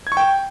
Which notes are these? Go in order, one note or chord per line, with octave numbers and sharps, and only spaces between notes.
G#6
C#6
G5